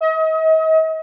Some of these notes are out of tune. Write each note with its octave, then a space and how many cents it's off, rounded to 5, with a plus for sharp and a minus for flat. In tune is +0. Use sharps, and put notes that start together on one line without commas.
D#5 +40